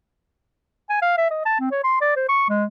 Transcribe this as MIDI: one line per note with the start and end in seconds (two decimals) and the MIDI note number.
0.89 0.98 80
1.02 1.16 77
1.17 1.29 76
1.30 1.42 75
1.45 1.56 81
1.60 1.71 60
1.71 1.81 73
1.84 1.98 84
2.01 2.15 74
2.16 2.25 72
2.29 2.47 85
2.49 2.64 56